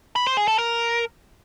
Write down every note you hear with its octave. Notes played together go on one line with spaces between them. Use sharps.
B5
C5
G#4
A4
A#4